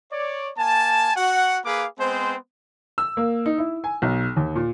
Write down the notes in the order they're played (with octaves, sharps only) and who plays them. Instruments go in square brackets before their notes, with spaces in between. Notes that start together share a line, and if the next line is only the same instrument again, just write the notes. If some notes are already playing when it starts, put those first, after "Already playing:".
[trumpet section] C#5 D5
A#3 G#5 A5
F#4 F#5
A#3 G#4 B4 F5 D6
G#3 B3 C4 C5
[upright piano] E6
A#3
D#4
E4
G#5
B1
D#2
A#2